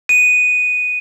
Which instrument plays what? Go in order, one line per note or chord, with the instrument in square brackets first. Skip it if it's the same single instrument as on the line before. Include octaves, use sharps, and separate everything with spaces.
[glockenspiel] D#7